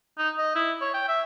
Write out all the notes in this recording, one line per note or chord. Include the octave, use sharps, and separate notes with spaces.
D#4
D#5
E4
C#5
G5
E5